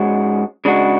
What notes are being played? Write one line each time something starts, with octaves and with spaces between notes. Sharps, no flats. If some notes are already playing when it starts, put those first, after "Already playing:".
Already playing: G#2 G#3 C#4 F#4
C#3 G#3 D4 F#4